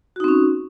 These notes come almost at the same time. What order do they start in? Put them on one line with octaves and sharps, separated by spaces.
F#4 D#4 C4 C#4